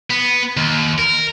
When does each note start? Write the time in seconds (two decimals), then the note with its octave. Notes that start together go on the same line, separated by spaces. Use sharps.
0.10 B3
0.57 D#2
0.98 A#4